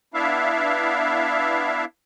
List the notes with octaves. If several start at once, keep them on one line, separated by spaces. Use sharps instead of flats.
B3 D4 E4 E5 F5